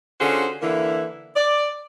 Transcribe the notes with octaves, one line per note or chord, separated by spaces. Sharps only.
D3 C#4 F4 F#4 G#4 C5
D3 E3 A#3 E4
D5